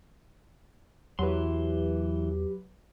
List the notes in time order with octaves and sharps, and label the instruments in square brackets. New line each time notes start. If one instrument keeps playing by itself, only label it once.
[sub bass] E2 [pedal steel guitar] E3 C6 [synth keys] F#3 B4 [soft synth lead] G4